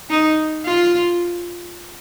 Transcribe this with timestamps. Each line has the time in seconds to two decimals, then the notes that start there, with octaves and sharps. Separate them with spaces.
0.10 D#4
0.65 F4